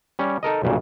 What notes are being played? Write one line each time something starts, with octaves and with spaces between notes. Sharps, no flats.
G3 C#4
D#4 A4 A#4 D#5
B1 G2 A#2 C#3